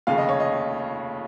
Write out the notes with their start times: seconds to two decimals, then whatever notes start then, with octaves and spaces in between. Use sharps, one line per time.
0.07 F1 D#2 C#3 F5
0.18 D#5
0.29 C#5
0.40 D#5